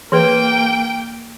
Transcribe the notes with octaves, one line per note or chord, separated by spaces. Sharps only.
E3 A#3 G#4 B4 G5